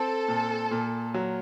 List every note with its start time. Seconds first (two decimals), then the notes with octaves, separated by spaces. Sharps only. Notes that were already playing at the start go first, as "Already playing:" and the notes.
Already playing: C4 A4
0.28 A#2
0.71 A#2
1.14 F#3